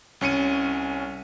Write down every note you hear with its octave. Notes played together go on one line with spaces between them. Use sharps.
C2 C#4 C#7 D#7